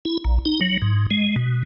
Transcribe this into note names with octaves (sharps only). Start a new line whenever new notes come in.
E4
A#1
D#4
F#3
G#2
G#3
B2